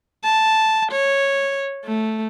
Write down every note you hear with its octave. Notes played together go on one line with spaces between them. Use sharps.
A5
C#5
A3